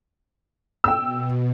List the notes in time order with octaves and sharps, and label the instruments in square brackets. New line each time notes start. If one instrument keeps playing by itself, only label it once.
[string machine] B2 [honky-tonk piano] G5 E6